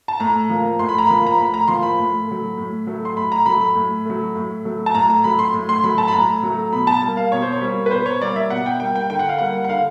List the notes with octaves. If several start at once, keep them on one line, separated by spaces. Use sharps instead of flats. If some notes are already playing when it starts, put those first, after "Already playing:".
A5
A2 A#5
F3 A#3
A2 C6
B5
A#5
F3 A#3 B5
A#5
A2 B5
A#5
F3 A#3 C6
B5
A2
F#3 A3
A2
F#3 A3
C6
A2 B5
A#5
F#3 A3 B5
B5
A2
F#3 A3
A2
F#3 A3
A5
A2 A#5
A#5
F#3 A3 B5
C6
A2
C6
F#3 A3 B5
A5
B5
A2 A#5
F#3 A3
B2 B5
A5
G3 A#3
F5
B2 C#5
C5
C#5
G3 A#3
B4
B2 C5
C#5
G3 A#3 D5
E5
B2 F#5
G5
G3 A#3 G5
G5
D3 G5
F#5
F5
G3 A#3 F#5
F#5
D3 F5